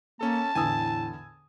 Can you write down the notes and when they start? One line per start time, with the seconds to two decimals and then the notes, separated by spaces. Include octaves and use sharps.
0.21 A#3 C#4 A4 A5
0.55 E2 A2 D3 G#5 D#6 E6